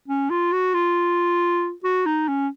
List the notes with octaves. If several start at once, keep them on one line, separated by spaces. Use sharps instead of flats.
C#4
F4
F#4
F4
F#4
D#4
C#4